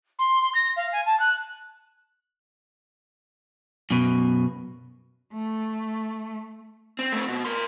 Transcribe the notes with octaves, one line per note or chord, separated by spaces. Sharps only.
C6
C6
A#6
F5
G#5
A5
F#6
F#2 B2
A3
C4
A3 C4
B2
A#4 C6